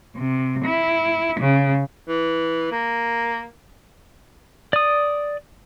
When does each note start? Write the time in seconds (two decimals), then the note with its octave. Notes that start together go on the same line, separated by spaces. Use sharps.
0.16 C3
0.65 E4
1.41 C#3
2.08 E3
2.72 A#3
4.73 D5 D#6